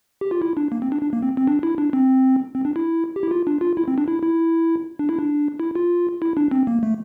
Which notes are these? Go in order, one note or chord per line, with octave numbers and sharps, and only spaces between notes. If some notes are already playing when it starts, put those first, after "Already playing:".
G4
F4
E4
D4
A#3
C4
D4
D4
A#3
C4
C4
D4
E4
D4
C4
C4
D4
E4
G4
E4
F4
D4
F4
E4
C4
D4
E4
E4
D4
E4
D4
E4
F4
E4
D4
C4
A#3
A3